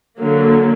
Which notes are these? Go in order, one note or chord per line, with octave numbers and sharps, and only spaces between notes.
D3 F#3 A#3